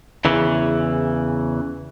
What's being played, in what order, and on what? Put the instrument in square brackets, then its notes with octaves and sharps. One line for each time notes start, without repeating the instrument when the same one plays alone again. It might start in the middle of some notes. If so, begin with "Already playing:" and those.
[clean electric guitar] E2 C#3 E3